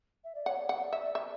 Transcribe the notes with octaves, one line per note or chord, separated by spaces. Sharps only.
E5
D5
C#5 F#5
D5
F#5
E5
D5 E5